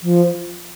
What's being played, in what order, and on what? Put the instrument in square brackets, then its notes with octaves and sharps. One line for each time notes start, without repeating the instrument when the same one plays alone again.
[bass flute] F3